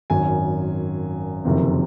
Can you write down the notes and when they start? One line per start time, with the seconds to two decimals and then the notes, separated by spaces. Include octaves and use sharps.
0.10 G#1 F#2 D#3 G#5
1.45 F#1 F2 C3 D#3